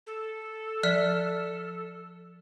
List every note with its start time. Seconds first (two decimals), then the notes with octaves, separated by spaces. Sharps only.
0.07 A4
0.83 F3 D5 F6 B6